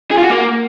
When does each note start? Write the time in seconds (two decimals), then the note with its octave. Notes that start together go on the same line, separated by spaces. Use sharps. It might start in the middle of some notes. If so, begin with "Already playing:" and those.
0.11 G#4
0.17 F4
0.24 F#4
0.30 A#3